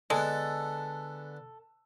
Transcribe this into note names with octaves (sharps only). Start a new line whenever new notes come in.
D3 G#3 B3 A4 G#5